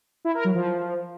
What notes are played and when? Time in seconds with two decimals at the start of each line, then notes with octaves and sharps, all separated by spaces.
0.25 E4
0.35 A#4
0.45 F#3
0.55 F3